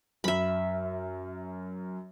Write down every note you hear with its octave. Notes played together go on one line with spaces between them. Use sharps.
F#2 E5 B5